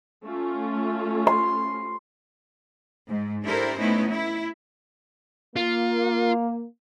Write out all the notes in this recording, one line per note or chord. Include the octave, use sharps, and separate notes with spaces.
A3 C#4 F4
C6
G#2
D4 E4 G4 A4 A#4 C5
A3 B3 C#4 D#4 E4
E4
A#3 F4